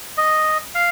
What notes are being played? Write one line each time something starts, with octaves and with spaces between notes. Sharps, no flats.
D#5
F5